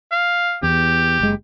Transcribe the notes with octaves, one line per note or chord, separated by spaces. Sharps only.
F5
E2 G4
F#1 G#3